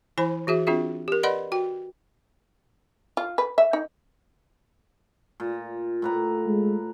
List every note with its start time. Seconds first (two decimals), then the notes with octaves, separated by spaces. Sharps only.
0.18 E3 E4 C5 G#5 B5
0.47 E3 F#4 G#4 E5
0.67 C4 D4 F4 G#4 E5
1.08 G4 A#4
1.23 B4 D5 D#5 F#5 B5 C6
1.52 F#4 G5
3.17 F4
3.38 B4
3.58 E5
3.73 D#4
5.40 A#2
6.02 A2 B4 A#5
6.47 G#3